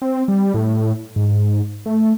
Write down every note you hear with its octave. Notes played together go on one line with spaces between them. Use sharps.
C4
G3
A2
G#2
A3